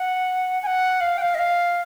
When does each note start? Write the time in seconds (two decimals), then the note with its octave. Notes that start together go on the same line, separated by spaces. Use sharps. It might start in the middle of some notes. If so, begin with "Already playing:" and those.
Already playing: F#5
0.63 G#5
0.67 F#5
1.01 F5
1.18 G5
1.22 F5
1.35 D#5
1.39 F5